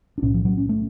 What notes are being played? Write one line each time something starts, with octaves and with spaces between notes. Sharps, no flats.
D4
B1 A2 C#4
F3
F#3
C#4
A3